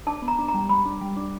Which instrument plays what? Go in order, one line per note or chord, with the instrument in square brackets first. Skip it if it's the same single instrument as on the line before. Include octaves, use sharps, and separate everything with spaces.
[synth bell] D4 [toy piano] A5
[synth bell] B3
[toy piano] A#5
[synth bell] D4
[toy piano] A#5
[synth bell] G3
[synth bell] G3 [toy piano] B5
[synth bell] D4
G3
D4